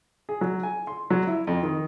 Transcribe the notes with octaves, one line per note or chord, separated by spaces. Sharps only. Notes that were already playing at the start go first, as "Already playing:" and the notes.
G#4
F#3
G#5
C6
F#3
E4
F2
D#3